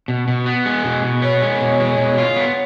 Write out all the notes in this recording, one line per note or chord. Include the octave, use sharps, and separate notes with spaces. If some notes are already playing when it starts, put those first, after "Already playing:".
B2
B2
B3
G#3
B2
B2
B3 C#5
G#3
B2
G#3
B2
F4
B3